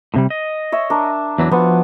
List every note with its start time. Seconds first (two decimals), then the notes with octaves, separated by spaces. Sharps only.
0.14 A2 C3 G3
0.30 D#5
0.72 C#5 E5
0.90 D4 A#4
1.38 E2 E3 F#3
1.51 F3 B3 F4 F#4